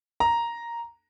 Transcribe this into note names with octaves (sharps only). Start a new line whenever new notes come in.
A#5